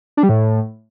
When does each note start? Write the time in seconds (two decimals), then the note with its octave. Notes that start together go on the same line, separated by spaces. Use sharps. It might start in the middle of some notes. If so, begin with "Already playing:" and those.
0.17 D4
0.23 G3
0.29 A2